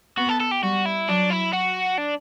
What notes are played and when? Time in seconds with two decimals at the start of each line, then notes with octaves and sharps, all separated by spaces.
0.18 B3 F#4
0.29 A4
0.40 A4
0.51 G4
0.63 G3 F#4
0.86 E4
1.08 F#3 D4
1.30 E4
1.53 F#4
1.98 D4